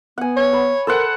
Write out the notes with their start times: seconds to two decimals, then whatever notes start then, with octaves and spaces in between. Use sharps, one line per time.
0.18 B3 F#5 G#5
0.36 C#5
0.53 B5
0.87 A4 A#4 C5 F#5